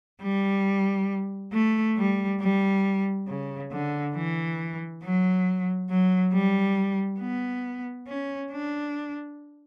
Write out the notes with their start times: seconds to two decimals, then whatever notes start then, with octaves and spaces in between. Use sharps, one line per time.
0.22 G3
1.53 A3
1.97 G3
2.40 G3
3.28 C#3
3.71 D3
4.15 E3
5.03 F#3
5.89 F#3
6.33 G3
7.20 B3
8.07 C#4
8.52 D4